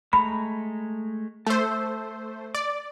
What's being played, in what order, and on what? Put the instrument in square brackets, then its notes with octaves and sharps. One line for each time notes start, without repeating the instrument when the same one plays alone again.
[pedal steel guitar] G#3 A3 A#5 [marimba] B5
[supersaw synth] A3 C5 [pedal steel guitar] A5 E6
[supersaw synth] D5 [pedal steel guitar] D6